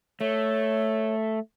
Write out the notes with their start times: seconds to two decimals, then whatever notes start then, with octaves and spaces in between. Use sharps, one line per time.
0.21 A3 C#5